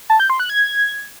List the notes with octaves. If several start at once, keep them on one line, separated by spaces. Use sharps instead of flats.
A5
G6
C6
F#6
G#6